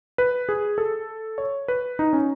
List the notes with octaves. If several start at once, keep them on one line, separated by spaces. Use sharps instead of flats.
B4
G#4
A4
C#5
B4
D#4
C#4